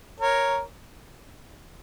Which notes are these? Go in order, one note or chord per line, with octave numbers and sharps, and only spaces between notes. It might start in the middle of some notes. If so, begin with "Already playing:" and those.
A#4 C#5